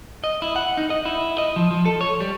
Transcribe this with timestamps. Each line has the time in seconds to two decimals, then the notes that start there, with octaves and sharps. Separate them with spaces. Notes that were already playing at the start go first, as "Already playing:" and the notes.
0.24 D#5
0.42 E4
0.56 F#5
0.77 D#4
0.90 D#5
1.05 E4
1.38 D#5
1.56 F3
1.71 F3
1.85 A4
2.01 C#5
2.20 G3